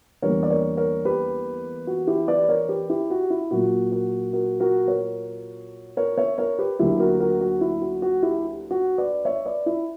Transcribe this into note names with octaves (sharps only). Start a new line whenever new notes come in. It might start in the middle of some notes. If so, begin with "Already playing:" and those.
E2 D3 G3 A#3 A#4 C#5
D5
A#4 C#5
A#4 C#5
G4 B4
F#4
E4 G4
B4 D5
A#4 C#5
G4 B4
E4 G4
F#4
E4
A#2 F#3 A#3 F#4
F#4 A#4
F#4 A#4
F#4 A#4
A#4 C#5
A#4 C#5
C#5 E5
A#4 C#5
G4 B4
D2 D3 F#3 A#3 E4 G4
F#4 A#4
F#4 A#4
F#4
E4
F#4
F#4
E4 G4
F#4
B4 D5
C#5 E5
B4 D5
E4